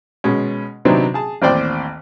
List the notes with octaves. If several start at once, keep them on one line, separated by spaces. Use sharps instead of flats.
B2 G#3 C#4
C3 F#3 B3 C4 D4 D#4
G#4 A5
A1 D#2 C4 C5 D5 G5